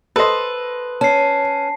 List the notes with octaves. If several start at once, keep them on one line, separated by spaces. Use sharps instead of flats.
A4 B4 C5 D#5
C#4 A5 C7